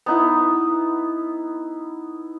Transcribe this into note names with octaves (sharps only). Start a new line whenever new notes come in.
B3 D#4 E4